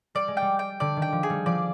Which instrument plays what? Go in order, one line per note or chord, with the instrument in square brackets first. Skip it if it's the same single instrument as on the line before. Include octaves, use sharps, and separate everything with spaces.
[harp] G3 [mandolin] D5
[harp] G#3
[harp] G3 [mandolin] G5
[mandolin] G5
[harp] D3 [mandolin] D5
[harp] D#3
[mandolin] G5
[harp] F3
[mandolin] G#4
[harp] G3
[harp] F3 [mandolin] D5